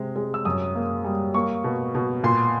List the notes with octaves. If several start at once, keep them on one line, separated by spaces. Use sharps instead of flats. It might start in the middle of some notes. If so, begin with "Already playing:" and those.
Already playing: C3 G#3
G#3
E6
F#2 D#6
A#3
G3
A#3 C#6
B2
B2
A#2 C6